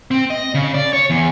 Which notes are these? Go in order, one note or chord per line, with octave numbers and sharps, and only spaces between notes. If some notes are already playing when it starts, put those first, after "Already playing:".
C4
D#5
C#3
D5
C#5
E2